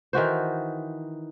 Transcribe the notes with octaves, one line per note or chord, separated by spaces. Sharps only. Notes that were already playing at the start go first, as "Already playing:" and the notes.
D#3 E3 F#4 C5